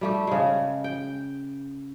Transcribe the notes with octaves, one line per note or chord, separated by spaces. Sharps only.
G3 A3 G4
C#3 G#3
G5